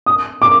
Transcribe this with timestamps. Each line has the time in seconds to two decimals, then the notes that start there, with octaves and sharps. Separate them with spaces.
0.06 D#6
0.42 D6